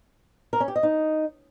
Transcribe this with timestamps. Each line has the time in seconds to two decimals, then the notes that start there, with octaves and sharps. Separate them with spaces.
0.53 A#4
0.60 C#4
0.68 G4
0.76 D#5
0.83 D#4